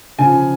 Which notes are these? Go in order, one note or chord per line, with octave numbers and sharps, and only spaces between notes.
C#3 F3 G#5